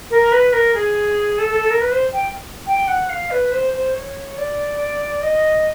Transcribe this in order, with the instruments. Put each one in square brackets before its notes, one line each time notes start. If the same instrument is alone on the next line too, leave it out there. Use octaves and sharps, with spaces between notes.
[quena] A#4
B4
A#4
G#4
A4
A4
A4
A#4
B4
C5
G5
G5
F#5
F5
B4
C5
C5
C#5
D5
D#5